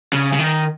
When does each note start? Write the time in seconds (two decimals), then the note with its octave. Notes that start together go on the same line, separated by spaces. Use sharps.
0.13 C#3
0.33 C#3
0.39 D#3